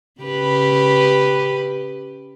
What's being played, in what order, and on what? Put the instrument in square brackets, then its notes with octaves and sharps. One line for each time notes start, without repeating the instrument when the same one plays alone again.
[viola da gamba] C#3 G4 B4